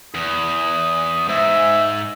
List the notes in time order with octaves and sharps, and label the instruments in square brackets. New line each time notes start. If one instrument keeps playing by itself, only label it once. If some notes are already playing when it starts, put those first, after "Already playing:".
[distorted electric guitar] E2 [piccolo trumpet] D#6
[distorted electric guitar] G#2 [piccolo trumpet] E5